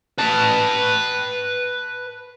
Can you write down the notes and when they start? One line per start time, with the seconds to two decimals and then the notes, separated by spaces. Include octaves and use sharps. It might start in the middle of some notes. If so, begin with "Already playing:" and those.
0.18 B4 A5